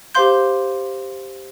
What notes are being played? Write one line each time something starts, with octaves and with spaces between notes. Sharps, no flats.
G4 C5 F5 C6 G6